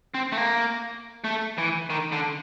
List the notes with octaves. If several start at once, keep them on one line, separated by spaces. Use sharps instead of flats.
C4
A3
A#3
A3
E3
D#3
D3